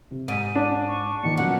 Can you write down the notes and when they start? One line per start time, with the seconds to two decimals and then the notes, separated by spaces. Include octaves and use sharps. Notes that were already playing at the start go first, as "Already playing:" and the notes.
0.11 C3
0.28 G#2 B6 D7 D#7
0.55 D4
0.88 C#6
1.23 A#2 D#3 F3 C#7
1.37 A#2 F#3 B3 C#4 F#5